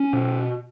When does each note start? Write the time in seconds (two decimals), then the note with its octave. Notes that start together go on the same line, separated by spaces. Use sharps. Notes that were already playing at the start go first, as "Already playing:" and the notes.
Already playing: C#4
0.13 B2